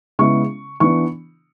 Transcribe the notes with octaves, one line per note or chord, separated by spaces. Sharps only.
C#3 G#3 B3 E4 C#6
E3 B3 D4 C#6